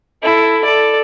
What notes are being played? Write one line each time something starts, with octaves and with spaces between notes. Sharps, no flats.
E4 A4
A4 D5